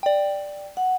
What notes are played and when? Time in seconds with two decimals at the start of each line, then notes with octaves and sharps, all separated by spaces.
0.03 D5 G5
0.77 F#5